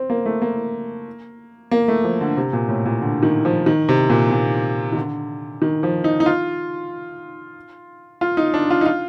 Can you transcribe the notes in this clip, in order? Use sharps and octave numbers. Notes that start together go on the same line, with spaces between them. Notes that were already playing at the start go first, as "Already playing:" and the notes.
Already playing: C4
A#3
A3
A#3
A#3
A3
F3
D3
C3
A#2
A2
A#2
D3
D#3
F3
D#3
C3
A#2
A#2
D#3
D3
D#3
F3
D#4
D#4
F4
F4
D#4
D4
F4
D#4
F4